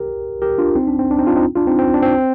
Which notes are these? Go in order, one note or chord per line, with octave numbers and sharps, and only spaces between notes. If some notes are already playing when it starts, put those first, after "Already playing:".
Already playing: G4 A#4
G4 A#4
D4 F4
C4 D#4
D4
C4
D4
C4 D#4
D4 F4
C4 D#4
D4 F4
C4 D#4
C4
D4
C4